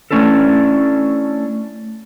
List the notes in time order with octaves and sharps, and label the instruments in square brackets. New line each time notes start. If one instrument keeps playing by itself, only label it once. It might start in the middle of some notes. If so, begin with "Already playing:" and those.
[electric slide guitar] A3 C#4 D4 E4 A4